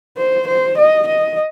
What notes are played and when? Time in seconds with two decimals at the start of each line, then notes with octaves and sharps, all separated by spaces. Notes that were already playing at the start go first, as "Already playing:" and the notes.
0.18 C5
0.48 C5
0.78 D#5
1.08 D#5